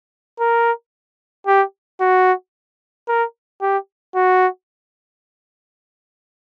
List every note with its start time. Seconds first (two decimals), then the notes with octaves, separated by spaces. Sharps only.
0.40 A#4
1.47 G4
2.00 F#4
3.08 A#4
3.61 G4
4.15 F#4